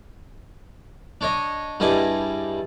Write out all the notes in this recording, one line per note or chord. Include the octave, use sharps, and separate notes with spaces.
D4 C#5 D#5
G2 G3 E4 G#4 D#5 A5